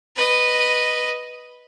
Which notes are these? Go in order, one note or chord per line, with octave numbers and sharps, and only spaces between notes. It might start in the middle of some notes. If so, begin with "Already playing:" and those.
B4 D#5